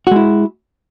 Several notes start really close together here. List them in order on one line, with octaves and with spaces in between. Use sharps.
F#4 G#3 E4